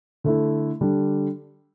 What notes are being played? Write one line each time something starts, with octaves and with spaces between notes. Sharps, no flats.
D3 A3 E4
D3 G3 D4